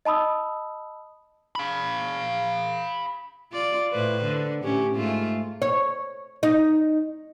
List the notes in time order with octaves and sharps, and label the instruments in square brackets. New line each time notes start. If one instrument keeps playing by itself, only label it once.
[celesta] D#5 A5 B5 D#6 E6
[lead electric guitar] F5 B5
[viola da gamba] F4 D5
A2 B4 C5
D3
A2 C#4 G4
G#2 A3 F4
[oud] C#5
D#4